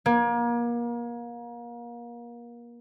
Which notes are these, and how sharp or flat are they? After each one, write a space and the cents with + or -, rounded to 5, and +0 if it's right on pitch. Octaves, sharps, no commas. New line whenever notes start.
A#3 +30